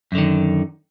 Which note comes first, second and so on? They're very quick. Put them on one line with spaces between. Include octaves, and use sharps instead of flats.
F#2 D3 D#3